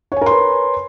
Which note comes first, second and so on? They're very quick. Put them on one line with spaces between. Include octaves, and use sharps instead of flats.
C#5 G#5 A#4 C6 B4